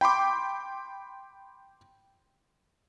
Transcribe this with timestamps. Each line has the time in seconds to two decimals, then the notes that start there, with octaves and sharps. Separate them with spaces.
0.01 G5 B5 C6 D6